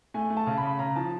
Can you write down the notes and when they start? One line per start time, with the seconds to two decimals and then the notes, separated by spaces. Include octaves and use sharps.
0.14 A3 G#5
0.30 A3
0.37 A5
0.47 C#3
0.58 B5
0.63 C#3
0.79 C#3 A#5
0.96 F3 A5